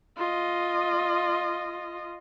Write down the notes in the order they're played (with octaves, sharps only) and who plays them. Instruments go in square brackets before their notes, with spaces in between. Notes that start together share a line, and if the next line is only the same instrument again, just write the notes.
[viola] F4 D#5